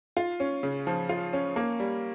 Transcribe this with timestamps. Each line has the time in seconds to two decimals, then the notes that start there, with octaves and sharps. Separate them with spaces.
0.17 F4
0.40 C#4
0.63 C#3
0.87 F3
1.09 F4
1.33 C#4
1.56 A#3
1.80 G3